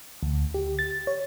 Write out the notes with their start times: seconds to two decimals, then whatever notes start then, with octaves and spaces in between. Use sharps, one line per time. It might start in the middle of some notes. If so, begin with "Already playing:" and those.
0.23 D2
0.54 G4
0.79 A6
1.07 C#5